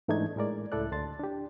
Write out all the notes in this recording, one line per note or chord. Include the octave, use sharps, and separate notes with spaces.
G#2 E3 A3 D4 D#4 G#6
A2 G#3 A#4 D5
C#2 A2 E4 A4 D5 F#6
D2 A5 C6 A6
D4 G4